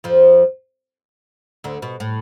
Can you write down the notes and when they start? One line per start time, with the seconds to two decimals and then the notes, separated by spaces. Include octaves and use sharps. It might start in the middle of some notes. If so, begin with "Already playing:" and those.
0.04 F2 F3
1.64 D2 D3
1.82 B2
2.00 A2